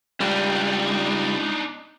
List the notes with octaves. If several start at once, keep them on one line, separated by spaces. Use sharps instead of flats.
C#2 G3 D4 D#4